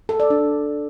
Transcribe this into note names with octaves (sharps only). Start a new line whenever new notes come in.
A4
D5
D4